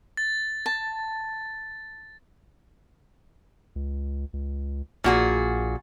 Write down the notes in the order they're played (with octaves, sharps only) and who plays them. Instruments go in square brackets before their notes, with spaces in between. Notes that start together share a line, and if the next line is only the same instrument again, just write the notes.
[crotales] A6
[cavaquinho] A5
[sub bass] C#2
C#2
[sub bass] A#1 [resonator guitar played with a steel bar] A#2 F#4 G#4